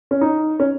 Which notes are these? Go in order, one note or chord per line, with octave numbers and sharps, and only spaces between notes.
C#4
D#4
C#4